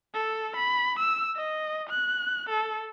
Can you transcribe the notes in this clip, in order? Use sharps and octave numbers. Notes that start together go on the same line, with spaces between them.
A4
B5
E6
D#5
F#6
A4